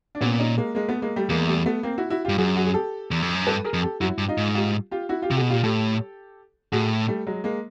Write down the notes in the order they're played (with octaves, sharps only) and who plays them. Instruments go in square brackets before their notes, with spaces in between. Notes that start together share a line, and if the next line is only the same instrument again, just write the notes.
[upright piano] D4
[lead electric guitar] A#2 [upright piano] B3 C#4
[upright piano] C#4 D#4
G#3 A#3
G#3 A#3
A3 B3
G#3 A#3
G3 A3
[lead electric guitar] E2 [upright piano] G#3 A#3
[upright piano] G3 A3
A3 B3
A#3 C4
E4 F#4
E4 F#4
[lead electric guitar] G2 [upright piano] F4 G4
[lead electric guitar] F#2 [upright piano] F#4 G#4
[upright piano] F#4 G#4
G#4
G4 A4
[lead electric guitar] E2
F2
F#2
[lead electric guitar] G2 [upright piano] A4 B4
[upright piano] G#4 A#4
[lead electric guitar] F2
[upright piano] G4 A4
[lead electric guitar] F#2 [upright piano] E4 F#4
[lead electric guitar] G2
[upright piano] D#4 F4
[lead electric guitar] G#2
[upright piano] F4 G4
F4 G4
E4 F#4
F4 G4
[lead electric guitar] C3
[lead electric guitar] B2 [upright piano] F#4 G#4
[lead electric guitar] A#2 [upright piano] F4 G4
[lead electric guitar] A2 [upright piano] G4 A4
[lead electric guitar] A2 [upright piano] F#4 G#4
[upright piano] G3 A3
F#3 G#3
G#3 A#3